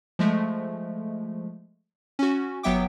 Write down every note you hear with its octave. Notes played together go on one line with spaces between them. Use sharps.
F3 G#3 A3
C#4 F#4
G1 F#3 B3 E5 G5 D6